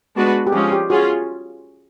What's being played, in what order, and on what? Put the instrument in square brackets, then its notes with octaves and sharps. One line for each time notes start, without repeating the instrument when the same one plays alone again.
[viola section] G#3 B3 D4 F#4 B4
[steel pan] G4
[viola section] F3 G#3 C#4 F4 [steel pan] G#4
[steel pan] G4
[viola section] C#4 F4 G#4 [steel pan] F#4